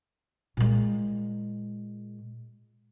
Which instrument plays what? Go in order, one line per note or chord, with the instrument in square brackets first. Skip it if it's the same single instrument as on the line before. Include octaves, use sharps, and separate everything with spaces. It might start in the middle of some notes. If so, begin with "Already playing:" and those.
[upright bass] A#2 G#3